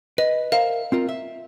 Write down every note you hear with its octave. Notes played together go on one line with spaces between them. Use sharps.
B4 D#5
A#4 C5 E5 F5
C4 F4 A#4
E5